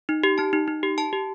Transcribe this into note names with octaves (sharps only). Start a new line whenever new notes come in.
D#4
G4
D#4 A5
D#4
D#4
G4
G4 A5
G4